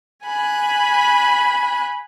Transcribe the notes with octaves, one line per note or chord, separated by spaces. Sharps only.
G#5 B5 F#6